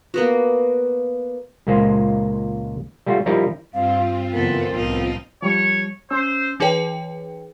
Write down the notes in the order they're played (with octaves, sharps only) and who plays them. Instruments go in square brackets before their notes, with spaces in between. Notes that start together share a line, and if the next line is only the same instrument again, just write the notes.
[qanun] A#3 B3 F#4
[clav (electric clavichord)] C#2 A#2 G#3 A#3 C5
G3 A3 F4 F#4
F3 G3 D#4 E4 A#4
[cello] G2 [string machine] C4 F4 [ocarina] F5
[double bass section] F#1 E3 [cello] B3 A4 [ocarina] A#4
[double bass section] C2 A2 B3 [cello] F3 D#4
[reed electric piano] F3 G3 [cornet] C#5
[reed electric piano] C#4 E6 [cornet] C5
[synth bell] E3 D#4 G#4 B4 C#5 G5